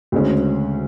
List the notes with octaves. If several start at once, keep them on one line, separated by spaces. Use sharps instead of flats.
D2 C#3 G#3 C#4